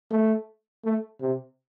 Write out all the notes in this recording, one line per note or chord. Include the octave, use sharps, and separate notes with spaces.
A3
A3
C3